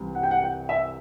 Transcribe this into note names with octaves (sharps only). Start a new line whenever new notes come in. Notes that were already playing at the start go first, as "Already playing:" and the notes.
Already playing: C2 C3 E3 G3
F#5
G5
F#5
G5
E5